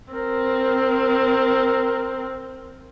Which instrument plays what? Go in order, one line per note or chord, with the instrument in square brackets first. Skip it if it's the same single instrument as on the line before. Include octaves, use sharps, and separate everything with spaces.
[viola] C4 [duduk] A#4